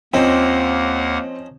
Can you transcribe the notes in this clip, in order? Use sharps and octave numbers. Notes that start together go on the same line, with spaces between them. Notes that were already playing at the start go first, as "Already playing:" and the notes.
D#2 F3 A#3 C4 C#4 D#4 F#5